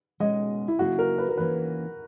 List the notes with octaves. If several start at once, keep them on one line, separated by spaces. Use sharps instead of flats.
B2 G#3 C#4 D#5
E4
C#3 F#3 A#3 E4 F#4 G#4
A#4
B4
A#4
E3 A#3 C#4 B4